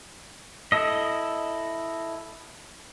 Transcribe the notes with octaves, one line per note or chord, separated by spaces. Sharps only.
E4 A4 D#5